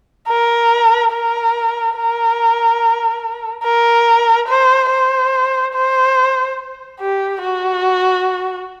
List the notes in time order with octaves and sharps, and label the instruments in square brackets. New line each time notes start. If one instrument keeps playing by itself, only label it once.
[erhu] A#4
A#4
A#4
A#4
C5
C5
C5
G4
F#4